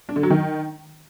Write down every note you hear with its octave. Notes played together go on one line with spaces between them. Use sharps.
D4
D3
F#3
D#3